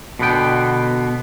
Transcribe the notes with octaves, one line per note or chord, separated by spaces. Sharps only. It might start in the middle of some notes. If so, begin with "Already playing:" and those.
B2 D3 B3 G5